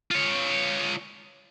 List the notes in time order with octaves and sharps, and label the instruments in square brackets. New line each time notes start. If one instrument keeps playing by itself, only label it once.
[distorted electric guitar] F4 C#5